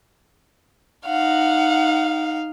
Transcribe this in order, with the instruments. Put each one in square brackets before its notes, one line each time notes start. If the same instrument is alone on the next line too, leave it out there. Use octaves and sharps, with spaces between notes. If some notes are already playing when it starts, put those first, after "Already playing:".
[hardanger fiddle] D#4 F5 [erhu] F#5